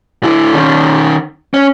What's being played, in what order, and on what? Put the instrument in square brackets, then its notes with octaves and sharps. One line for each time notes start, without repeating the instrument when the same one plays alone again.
[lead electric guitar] D3 E4
D#3 C#4
C#4